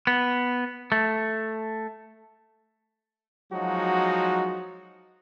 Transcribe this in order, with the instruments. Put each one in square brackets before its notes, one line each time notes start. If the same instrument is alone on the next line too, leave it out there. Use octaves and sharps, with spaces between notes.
[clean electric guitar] B3
A3
[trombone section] F3 F#3 G#3 D#4 F#4